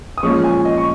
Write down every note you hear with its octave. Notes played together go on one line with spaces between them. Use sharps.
D#6
A#2 F3 G#3 C#4 C#6
G#5
D#5
C#6